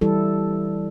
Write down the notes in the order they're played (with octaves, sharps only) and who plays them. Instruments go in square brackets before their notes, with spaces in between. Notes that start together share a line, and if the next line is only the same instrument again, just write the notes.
[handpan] E3 G3 E4 A4